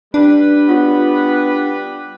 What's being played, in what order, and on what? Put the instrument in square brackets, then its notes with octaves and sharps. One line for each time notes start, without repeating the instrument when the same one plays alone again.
[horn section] G3 B4 [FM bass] D4
[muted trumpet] B3 [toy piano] F4 G4 C#5